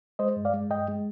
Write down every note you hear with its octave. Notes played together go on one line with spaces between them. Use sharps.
G#3 C5 D#5
G2
D5 F5
G#3
G2 D#5 G5
G#3